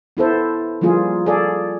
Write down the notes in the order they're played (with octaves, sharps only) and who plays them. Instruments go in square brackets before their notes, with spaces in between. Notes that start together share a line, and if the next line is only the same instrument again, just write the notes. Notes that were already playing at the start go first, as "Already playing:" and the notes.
[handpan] B3 E4 A4 C5
F3 G3 A#3 F4 G#4
G#4 A4 D5